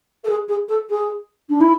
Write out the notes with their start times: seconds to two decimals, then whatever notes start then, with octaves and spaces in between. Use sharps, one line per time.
0.24 A4
0.29 G#4
0.48 G#4
0.68 A4
0.89 G#4
1.49 D4
1.60 E4